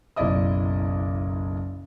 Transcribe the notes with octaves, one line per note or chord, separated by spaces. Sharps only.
F#1 B1 E4 D5 D#5 D#6